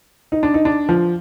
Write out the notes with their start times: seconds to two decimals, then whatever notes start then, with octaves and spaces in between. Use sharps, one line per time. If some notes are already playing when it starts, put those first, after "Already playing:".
0.32 D#4
0.43 D4
0.54 D#4
0.65 D4
0.89 F3